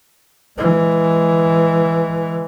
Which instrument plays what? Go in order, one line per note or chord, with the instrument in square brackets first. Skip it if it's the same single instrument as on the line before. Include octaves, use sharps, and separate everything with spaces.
[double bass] E3 G#3